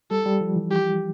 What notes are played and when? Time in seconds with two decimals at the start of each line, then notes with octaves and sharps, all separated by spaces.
0.11 G3 A4
0.26 G3
0.41 F3
0.56 E3
0.71 G4